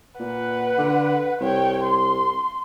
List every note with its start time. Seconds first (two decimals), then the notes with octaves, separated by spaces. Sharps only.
0.19 A#2 B4 F#5
0.78 D3
1.41 C2 C#5 G5
1.84 C6